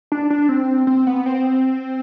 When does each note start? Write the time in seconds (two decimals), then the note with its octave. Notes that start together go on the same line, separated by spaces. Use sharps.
0.12 D4
0.30 D4
0.49 C4
0.87 C4
1.07 B3
1.26 C4